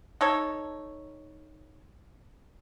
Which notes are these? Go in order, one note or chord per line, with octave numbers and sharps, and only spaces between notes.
D#4 A4 C#5